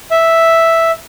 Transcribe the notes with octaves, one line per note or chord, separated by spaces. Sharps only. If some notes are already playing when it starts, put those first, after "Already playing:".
E5